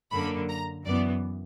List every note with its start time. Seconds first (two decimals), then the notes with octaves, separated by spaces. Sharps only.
0.11 F#2 D3 A#3 B5
0.48 A#5
0.85 F#2 E3 B3 D5